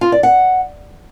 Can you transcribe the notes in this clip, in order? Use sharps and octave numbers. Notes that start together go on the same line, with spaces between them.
F4
D5
F#5